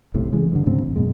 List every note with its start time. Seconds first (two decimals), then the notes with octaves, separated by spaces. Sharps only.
0.14 F#1 B1 A2 C3
0.33 C#3 E3 G#3
0.52 G2 D3
0.66 D2 G#2 C#3 C4
0.82 A1
0.96 F#2 B2 G#3